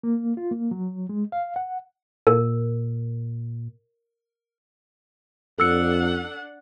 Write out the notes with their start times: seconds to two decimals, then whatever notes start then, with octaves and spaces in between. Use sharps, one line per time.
0.03 A#3
0.37 F4
0.51 A#3
0.71 F#3
1.09 G#3
1.32 F5
1.56 F#5
2.27 A#2 A#4
5.58 F2 D4 A4 F#5 E6 C#7